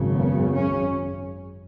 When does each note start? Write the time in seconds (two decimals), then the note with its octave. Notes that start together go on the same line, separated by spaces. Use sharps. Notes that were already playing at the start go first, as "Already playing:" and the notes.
Already playing: G#1 F#2 C#3
0.15 B3
0.52 C#4